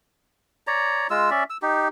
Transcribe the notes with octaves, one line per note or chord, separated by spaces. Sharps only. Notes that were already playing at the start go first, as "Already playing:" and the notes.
C#5 D5 A#5
G#3 F4 E6
C#4 D5 E5
E6
D#4 G4